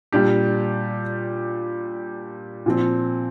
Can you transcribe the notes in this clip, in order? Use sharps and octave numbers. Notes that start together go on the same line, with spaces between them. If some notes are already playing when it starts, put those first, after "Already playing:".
A#2 G3 D4 G4
A#2 F3 C4